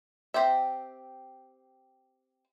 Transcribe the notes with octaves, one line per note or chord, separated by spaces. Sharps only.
C4 G4 E5